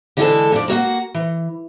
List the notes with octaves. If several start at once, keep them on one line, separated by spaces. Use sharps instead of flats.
D3 E3 G#3 B3 G#4 A4
F2 D4 D5
A#3 F#4 D#5 F#5
E3